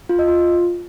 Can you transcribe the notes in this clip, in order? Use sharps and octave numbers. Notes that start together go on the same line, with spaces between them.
F4
D#5
F4